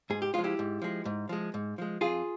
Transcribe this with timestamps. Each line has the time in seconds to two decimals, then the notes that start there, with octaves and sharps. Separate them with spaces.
0.10 G#2 G#4
0.22 G4
0.34 F3 G#3 F4
0.44 E4 G4
0.59 G#2
0.82 F3 G#3
1.05 G#2
1.29 F3 G#3
1.54 G#2
1.78 F3 G#3
2.01 F2 F4 G#4